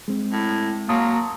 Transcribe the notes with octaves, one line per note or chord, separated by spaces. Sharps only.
G#3 C4
A2
F#3 A#3 A5 C6 D#6